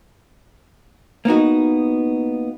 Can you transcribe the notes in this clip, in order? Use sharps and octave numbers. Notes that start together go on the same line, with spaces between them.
A#3 B3 D#4 F#4